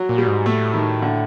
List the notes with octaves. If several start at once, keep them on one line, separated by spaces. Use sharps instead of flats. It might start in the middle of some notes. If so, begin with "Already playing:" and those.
Already playing: F#3
A#2
G3
G#2
A2 A3
D#3
D3